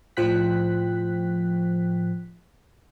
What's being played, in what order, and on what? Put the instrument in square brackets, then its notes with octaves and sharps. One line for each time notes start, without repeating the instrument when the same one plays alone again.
[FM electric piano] A2 F3 C5 G5 F#6 B6